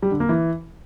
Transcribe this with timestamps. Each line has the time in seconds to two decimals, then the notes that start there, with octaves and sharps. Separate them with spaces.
0.02 G3
0.11 D3
0.20 A#3
0.29 E3